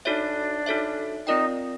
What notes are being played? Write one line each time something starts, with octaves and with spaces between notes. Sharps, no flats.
D4 D#4 F#4 A4 C#5 E5
D#4 F#4 A4 C#5 E5
C4 D#4 F4 A#4 D5 G5